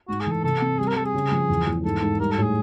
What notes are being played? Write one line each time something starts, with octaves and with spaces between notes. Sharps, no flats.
G#2 F#4
G#4
E3 A4
C3 A4
C4
G3 G#4
A#4
G3 A4
G#4
C#3
F3
E2
E2
G#2 A4
G#2
G3 A#4
A4
A2
G#4